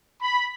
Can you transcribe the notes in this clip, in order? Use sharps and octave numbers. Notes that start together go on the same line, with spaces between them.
B5